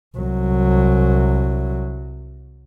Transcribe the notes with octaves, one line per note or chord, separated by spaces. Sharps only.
C2 F#3